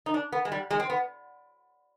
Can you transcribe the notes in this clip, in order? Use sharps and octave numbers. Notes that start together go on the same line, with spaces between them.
D#4
D4
B3
G#3
G3
G#3
C4
B3